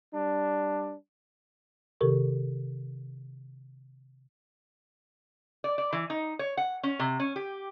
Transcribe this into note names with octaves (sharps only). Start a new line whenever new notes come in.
G3 D4
C3 D#3 G4 A4 A#4 C#6
D5
D5
E3
D#4
C#5
F#5
C#4
C3
C#4
G4